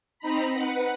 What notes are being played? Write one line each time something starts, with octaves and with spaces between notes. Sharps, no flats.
C4 D#4 A#5 B5
B4 F#5